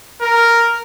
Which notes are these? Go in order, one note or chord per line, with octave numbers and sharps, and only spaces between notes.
A#4